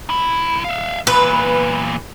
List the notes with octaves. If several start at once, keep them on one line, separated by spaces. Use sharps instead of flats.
C2 E4
E5 F5
E2 A#2 B4